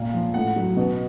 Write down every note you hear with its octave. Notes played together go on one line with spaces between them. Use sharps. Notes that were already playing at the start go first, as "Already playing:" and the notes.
Already playing: A#2 F5
F3
A2 F#5
F#3
B2